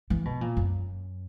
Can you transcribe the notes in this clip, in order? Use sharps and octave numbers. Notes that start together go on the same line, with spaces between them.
E3
B2
A#2
F#2